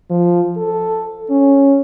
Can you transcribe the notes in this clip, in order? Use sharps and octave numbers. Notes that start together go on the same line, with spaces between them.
F3
A4
C#4